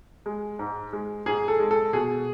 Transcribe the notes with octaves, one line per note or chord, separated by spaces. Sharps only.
G#3
G#2
G#3
G#2 G#4
A4
G#3
A4
B2 G#4